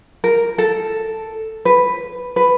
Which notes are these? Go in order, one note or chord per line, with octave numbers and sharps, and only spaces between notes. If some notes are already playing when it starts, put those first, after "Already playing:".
A#4
A4
B4
B4